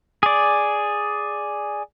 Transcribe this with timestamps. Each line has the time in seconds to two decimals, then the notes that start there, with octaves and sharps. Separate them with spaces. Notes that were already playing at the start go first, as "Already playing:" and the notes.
0.23 G#4 D5